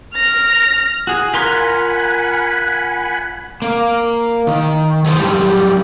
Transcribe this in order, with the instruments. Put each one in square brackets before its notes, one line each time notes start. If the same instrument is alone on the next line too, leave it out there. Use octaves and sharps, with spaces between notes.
[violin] F6 A#6
[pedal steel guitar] F#4 G#4
[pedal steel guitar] F4 A#4 C6 [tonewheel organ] F#5 G#5 B5
[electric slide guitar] A#3
D#3
E3 G#4 A4 C5
F#2 G3